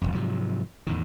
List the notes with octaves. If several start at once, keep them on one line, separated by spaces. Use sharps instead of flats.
D#1 G#1 F2
G#2 C3 F3 F#3
E2 A2 D#3